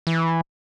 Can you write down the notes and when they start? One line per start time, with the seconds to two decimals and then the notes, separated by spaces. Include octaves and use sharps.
0.07 E3